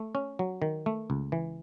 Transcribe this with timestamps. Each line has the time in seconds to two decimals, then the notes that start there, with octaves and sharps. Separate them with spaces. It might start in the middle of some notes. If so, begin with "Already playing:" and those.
Already playing: A3
0.15 C#4
0.39 F#3
0.62 D#3
0.86 A3
1.10 C#2
1.32 E3